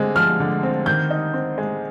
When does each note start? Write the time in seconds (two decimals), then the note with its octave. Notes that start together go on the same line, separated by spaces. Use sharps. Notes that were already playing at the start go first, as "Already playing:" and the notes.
Already playing: D3 G#3 C4
0.16 F3 F6
0.40 D3
0.63 C4
0.86 D#3 G6
1.10 D#4
1.34 C4
1.58 G#3